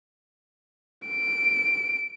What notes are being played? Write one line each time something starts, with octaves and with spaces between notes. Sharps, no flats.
D7